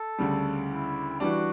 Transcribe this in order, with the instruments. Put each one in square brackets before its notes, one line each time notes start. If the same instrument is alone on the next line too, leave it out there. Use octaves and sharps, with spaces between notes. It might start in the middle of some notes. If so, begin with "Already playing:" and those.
Already playing: [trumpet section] A4
[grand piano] D2 C#3 G3
[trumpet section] E4
[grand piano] E3 G3 D4 [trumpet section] F#4